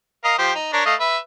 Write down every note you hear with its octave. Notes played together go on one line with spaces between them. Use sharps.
A#4 D#5 F5
F3 G4 C5
D#4
D4 A#4 C#5
A3 D#5 F5
B4 E5